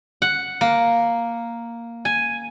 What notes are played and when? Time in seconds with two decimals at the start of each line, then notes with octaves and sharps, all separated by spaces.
0.22 F#5
0.61 A#3
2.05 G#5